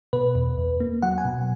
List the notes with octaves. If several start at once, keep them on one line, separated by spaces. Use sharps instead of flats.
B2 B4
E2
E2
A#3
F#3 F#5
G#5
B2